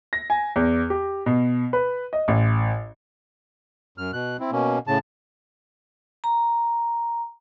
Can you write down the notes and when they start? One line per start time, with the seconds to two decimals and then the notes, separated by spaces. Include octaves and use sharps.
0.13 A#6
0.30 G#5
0.56 E2
0.90 G4
1.26 B2
1.73 B4
2.13 D#5
2.28 A1
3.98 F#2 F6
4.13 B2 F#6
4.40 C4 E4
4.52 B2 A#3 C#4
4.87 A2 C#3 A5
6.24 A#5